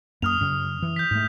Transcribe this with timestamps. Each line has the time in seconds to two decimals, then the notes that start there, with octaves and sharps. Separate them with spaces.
0.22 F#2 A#3 D#6 F6 F7
0.41 F#2 C#3
0.82 E3
0.96 G6 B6
1.11 G#2 A3